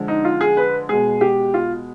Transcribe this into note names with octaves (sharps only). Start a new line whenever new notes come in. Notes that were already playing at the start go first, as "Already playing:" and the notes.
Already playing: D3 F3 G#3
D#4
F4
G#4
B4
B2 G#3 G#4
G4
F4